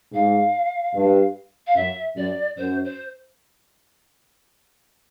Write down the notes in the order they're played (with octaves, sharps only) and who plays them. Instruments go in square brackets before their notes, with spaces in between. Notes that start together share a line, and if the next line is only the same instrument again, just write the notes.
[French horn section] G#2 [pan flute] F5
[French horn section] G2
[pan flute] F5
[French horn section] F#2 [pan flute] E5
[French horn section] F#2 [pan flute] D5
[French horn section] F#2 [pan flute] C5
[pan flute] C5